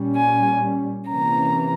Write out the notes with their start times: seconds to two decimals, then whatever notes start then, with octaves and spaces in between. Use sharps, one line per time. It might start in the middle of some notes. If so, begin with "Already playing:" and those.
Already playing: A#2 G3 C#4
0.15 G#5
1.06 C3 E3 A#3 C#4 A#5